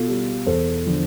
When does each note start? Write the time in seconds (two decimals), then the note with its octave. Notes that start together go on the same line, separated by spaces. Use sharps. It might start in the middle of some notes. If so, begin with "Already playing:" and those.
Already playing: B2 F4 A4
0.08 G3
0.46 E2 A4 C5
0.86 D3 F3